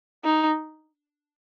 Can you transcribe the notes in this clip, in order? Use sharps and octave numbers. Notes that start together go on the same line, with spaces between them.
D#4